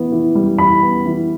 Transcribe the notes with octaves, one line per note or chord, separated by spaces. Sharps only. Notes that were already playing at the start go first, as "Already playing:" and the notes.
Already playing: E3 B3
E3
G3
E3 B5
B3
E3